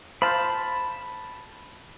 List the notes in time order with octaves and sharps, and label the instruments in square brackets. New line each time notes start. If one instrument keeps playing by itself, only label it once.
[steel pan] C5 F5 [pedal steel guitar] A5 B5